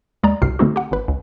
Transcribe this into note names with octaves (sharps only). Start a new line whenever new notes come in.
D#2 G#3 D5 A#5
C2 G2 C3 F#4 F6 C7
D3 A3 C4 D#4 F#4
G4 F#5
G#1 B4
C#2